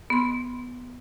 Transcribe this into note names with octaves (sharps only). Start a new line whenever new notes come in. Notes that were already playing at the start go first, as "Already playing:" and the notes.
B3 C6